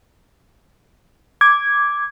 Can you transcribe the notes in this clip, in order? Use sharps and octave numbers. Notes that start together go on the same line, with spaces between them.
D6 G#6